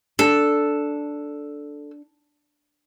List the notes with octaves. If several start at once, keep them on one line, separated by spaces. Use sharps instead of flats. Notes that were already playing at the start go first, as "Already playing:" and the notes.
D4 A4